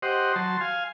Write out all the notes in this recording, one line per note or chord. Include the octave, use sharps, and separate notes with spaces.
G4 C5 D#5 F#5
F#3 A5 C6
F5 G#5